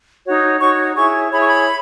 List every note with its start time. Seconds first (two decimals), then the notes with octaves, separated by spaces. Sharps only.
0.25 D#4 F#4 C#5
0.60 D#4 F#4 C#5 C#6
0.95 E4 G#4 C#5 C#6
1.31 E4 G#4 C#5 B5
1.40 C#6
1.48 B5